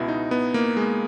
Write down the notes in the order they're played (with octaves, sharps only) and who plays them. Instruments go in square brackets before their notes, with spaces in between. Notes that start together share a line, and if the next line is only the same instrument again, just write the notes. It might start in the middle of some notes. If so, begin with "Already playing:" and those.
Already playing: [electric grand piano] C#2 B2 E4
D#4
B3
A#3
G#3